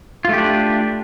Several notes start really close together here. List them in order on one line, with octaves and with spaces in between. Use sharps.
F4 A3 G4 D4